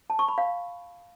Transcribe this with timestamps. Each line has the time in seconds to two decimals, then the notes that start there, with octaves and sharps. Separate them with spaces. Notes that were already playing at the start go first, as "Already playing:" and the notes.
0.10 A5
0.19 C#6
0.28 B5
0.38 F5